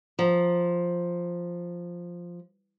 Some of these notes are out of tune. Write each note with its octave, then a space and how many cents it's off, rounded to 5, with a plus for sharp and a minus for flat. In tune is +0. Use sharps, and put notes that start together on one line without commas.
F3 +0 A#5 +0